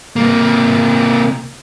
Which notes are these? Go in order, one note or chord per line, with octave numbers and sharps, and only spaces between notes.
C3 A#3